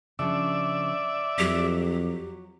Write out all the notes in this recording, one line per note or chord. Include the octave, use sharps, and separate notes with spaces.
C#3 F3 D4 D5 E5
F2 F#3 G4